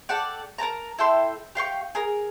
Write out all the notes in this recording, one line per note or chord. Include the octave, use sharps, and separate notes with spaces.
A4 D5 F#5 G5
A#4 B4 A5 A#5
E4 A4 G5 C6
G4 F5 G5 C#6
G#4 A#4